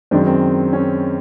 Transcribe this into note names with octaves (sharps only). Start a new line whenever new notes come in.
F#2 D#3 G#3 C4 D4
C4
C#4